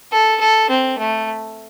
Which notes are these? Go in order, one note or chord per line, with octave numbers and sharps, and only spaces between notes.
A4
A4
C4
A3